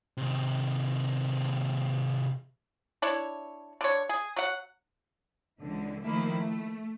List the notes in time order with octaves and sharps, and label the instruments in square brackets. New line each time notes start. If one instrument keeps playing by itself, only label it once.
[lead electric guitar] C3 D#3
[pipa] D4 E4 C#5
D3 C#5
G#4
F#3 F#5
[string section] C#2 D3 E3
D#3 F3 A3 A#3 E4
A3